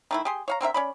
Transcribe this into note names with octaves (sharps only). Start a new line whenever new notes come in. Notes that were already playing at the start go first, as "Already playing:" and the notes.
D#3 A3 E4
G4 G#4 C6
C#5 F5 A#5
D3 C4 A#4 E5
C#4 D5 B5